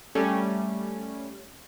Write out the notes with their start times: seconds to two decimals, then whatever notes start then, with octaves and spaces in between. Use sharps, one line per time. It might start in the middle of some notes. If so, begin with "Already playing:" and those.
0.15 G3 A3 C#4